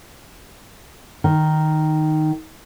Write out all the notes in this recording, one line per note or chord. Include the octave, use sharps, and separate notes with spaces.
D#3